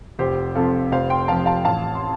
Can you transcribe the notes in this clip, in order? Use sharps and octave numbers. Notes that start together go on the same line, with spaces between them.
F1 G4 C5
F2 C3 F3 F4 A4
F1 C5 F5
G5 C6
F2 C3 F3 F5 A5
F5 A5
A1 F5 A5
C6